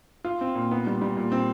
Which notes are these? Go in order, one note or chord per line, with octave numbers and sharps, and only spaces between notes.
F4
C4
A#2
B3
G3
G3
A#2
C4